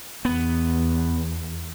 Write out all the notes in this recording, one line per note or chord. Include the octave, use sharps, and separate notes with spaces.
E2 B3